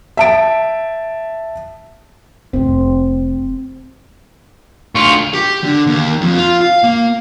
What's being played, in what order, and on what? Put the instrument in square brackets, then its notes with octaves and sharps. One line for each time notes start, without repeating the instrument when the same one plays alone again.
[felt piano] E5 A5 D7
[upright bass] F1 F#2 [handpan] C4
[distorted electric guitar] D2 F4 [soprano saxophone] C#6
[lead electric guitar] G4
D3
D#2
F2
F4
F5
A#3